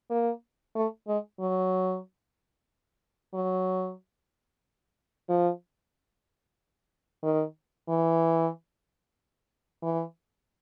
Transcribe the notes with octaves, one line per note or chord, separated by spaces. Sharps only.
A#3
A3
G#3
F#3
F#3
F3
D#3
E3
E3